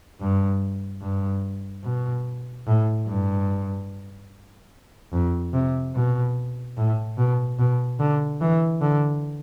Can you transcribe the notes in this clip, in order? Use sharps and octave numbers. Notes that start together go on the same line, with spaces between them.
G2
G2
B2
A2
G2
F2
C3
B2
A2
B2
B2
D3
E3
D3